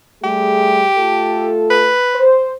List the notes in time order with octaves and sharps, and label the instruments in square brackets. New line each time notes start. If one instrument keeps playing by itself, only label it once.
[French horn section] G3 A3 G#4 [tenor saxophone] G4
[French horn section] A3 F4 A4
[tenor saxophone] B4
[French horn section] C5